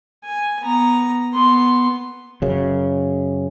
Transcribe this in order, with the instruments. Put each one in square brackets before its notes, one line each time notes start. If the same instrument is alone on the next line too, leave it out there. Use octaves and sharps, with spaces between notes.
[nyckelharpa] G#5
B3 A#5
B3 C6
[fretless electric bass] F#2 C#3